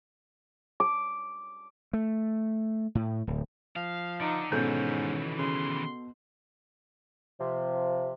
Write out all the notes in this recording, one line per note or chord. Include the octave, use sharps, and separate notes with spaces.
D6
A3
A2
D1
F3 F5
D3 D#4
G#2 B2 D#3 E3 C#4 A4 G6
C#3 C6
C3 F3